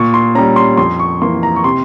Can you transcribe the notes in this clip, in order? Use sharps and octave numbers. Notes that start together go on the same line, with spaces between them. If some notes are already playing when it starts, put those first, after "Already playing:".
Already playing: A#2 C#6
C6
G3 C#4 A#5
C6
F2 C6
C#6
E3 A#3 C6
A#5
C#6
C3 C6